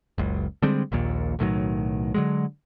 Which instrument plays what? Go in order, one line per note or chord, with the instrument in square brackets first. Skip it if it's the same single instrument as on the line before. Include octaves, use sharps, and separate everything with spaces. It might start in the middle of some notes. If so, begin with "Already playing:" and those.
[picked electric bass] F#1 C#2
D3 G3 G#3 C4
A#1 D#2 A#2
B1 A2 D#3 F#3
D3 F#3 G#3